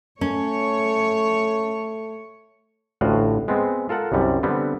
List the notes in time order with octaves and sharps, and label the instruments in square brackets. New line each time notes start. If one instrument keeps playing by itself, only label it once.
[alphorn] A3 [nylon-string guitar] C#4 [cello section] C#5
[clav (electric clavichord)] A1 D2 A2 F4 F#4
G#3 B3 C4
F4 A4 A#4 F#5
C2 F#2 C3 G3
D3 G3 B3 C4